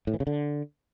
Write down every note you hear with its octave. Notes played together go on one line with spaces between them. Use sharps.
A2
E3
C#3
D3